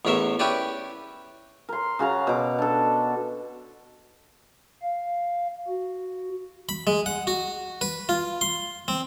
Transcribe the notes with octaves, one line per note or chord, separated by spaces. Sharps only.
A1 E2 C#4 A#4 E5
C#4 E4 G4 B4 D5
A#4 C6
C#3 F#4 F5 A#5
B2 D6
D4 A4
F5
F#4
B5
G#3
F#5
F#4
B4
F4
C6
C4